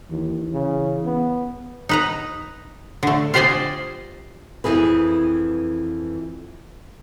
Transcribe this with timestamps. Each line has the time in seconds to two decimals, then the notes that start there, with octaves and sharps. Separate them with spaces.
0.11 D#2 E3
0.53 C#3
1.05 B3
1.89 D#4 B4 A#5
3.03 D3 A3
3.34 F4 G4 C5 D5 D#5 G#5
4.64 F2 A#2 E3 G#4 B4